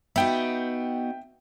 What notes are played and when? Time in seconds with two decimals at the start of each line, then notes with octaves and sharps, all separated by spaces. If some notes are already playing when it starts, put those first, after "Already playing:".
0.16 B3 D#4 F#4 E5 G5